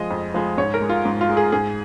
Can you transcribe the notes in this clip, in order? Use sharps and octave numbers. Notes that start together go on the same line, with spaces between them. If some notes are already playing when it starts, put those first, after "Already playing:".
Already playing: F3 G#3 D#5
F2
F3 G#3
G#2 C#5
A#4
G#3
F4
G#2
F4
G#3
G#4
G#2 G#4